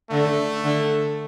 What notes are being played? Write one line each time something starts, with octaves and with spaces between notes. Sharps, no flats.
D3 A3
D3